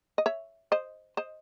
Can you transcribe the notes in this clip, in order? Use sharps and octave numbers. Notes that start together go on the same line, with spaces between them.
D#5
C#5 E5
C5 D#5
C5 D#5